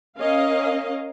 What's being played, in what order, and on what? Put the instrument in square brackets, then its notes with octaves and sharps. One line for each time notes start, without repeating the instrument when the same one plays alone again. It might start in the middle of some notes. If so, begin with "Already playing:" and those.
[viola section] C#4 A#4 D#5 F5